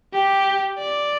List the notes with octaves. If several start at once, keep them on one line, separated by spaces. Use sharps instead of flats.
G4
D5